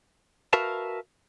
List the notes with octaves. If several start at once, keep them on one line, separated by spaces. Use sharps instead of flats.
F#4 A#4 B4 E5 F5 A5